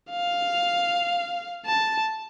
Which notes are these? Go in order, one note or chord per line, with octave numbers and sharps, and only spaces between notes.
F5
A5